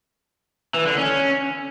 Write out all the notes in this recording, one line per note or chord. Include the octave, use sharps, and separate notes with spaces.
E3
D3
C#4